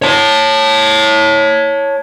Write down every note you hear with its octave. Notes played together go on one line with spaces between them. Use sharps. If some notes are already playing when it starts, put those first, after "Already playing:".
C#5 A5